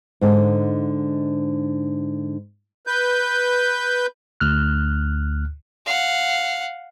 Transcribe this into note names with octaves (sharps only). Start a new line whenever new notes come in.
G#2 D3 D#4
B4 G6
D2 F6 F#6
F5 F#5